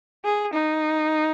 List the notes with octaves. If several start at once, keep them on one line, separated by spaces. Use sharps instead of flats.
G#4
D#4